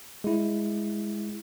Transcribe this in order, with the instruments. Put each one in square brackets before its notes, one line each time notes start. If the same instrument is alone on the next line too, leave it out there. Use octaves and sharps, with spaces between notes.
[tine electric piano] G#3 E4